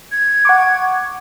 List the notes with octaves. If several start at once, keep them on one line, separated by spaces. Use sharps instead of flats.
G#6
F#5 C#6 D6